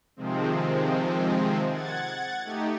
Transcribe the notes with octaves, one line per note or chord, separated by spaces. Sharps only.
C3 D#3 F3 G#3 C4
F#5 G#6 A6
A3 D#4 G4